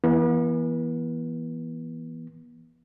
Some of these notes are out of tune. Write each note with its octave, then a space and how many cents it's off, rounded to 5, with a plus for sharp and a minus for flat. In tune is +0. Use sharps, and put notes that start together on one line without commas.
E3 +0 B3 -40